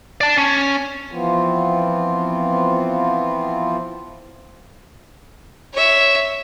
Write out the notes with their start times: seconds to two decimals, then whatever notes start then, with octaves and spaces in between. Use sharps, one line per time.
0.21 D5 A5
0.38 C#4
1.11 E3 F3 B3 C4 F4
5.73 C#5 E5